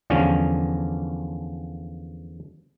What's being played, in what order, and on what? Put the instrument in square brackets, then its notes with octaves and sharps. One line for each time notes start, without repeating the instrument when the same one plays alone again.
[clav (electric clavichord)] E2 D3 F3 G3 C#4